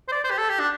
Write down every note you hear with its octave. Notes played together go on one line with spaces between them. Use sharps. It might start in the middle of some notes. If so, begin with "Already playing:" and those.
C5
D5
C5
G4
A4
G4
D4